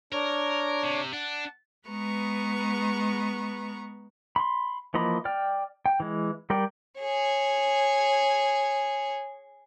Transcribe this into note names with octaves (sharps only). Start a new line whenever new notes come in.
D4 A#4 C#5
C3
D4 F#5
G#3 B3 B4 A#5 C#6
B5 C6
E3 F3 A#3 D#5 B5
D5 G5 F6
G5
E3 G#3
G3 A#4 D5 G5
G#4 C#5